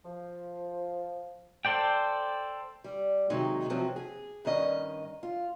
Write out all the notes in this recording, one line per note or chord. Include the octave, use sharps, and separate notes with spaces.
F3
A4 C5 D5 G5
G3
C3 D#3 F#3 G#3 D#4
C3 F3 F#3 C4
G#4
G2 D#3 C#4 D#5
F4